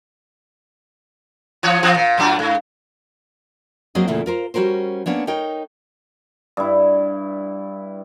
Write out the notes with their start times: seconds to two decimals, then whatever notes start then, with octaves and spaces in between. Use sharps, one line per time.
1.63 E3 F3 C#5
1.83 E3 F3 C4
1.95 A#2
2.18 A2 F#3 D4
2.39 G#2
3.95 F#3 A#3 C4 F#4 G#4 D#5
4.08 E2 A#2 C#3 A3 E4
4.26 F4 A#4 C5
4.54 G3 C#4 F#4 A#4 C5
5.06 A#3 B3 C#4 D4
5.27 D#4 A#4 C#5 G5
6.57 G2 E4